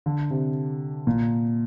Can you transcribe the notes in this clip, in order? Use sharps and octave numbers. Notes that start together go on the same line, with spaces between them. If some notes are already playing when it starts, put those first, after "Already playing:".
D3
C3
A#2